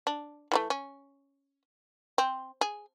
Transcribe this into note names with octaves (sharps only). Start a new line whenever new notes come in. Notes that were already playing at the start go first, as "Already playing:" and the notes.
D4
E3 G3 A3
C#4
C4
G#4